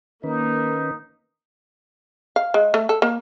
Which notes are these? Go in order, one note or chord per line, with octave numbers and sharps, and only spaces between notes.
D#3 A#3 C#4 D#4 B4
F5
G#3
A3
A4
A#3